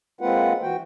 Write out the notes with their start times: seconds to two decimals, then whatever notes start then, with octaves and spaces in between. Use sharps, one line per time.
0.21 G#3 A#3 C4 F4 B4 F#5
0.62 E3 F#4 G5